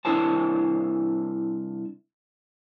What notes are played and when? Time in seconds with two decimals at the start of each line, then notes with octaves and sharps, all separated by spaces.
0.05 C2 D4 E4 A#4 C5 A5